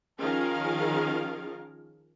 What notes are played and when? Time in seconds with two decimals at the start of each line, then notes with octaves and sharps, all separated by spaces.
0.19 D#3 F3 C#4 G#4 A#4 F5